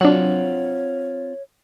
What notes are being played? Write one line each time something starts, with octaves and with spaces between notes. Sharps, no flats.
F#3 C4 D4 F4 C#5 F#5